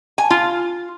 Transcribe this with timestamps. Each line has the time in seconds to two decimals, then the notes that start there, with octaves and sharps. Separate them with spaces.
0.18 G#5
0.30 F4